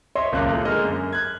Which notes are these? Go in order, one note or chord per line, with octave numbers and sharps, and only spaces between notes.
C#5 D#5 E5 C6
D#1 C#2 F#2 A#2 F#6
A3 F4
D3 G#3 A#3 D#5 F6
F#2
F#6 G#6